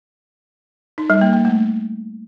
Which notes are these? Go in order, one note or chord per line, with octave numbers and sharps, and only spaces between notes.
D#4
G3
A#3
A#3
A3